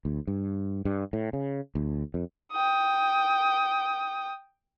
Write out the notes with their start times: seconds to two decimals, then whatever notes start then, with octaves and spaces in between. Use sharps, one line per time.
0.05 D2
0.27 G2
0.85 G2
1.13 A2
1.33 C#3
1.75 D2
2.14 F2
2.52 G5 D#6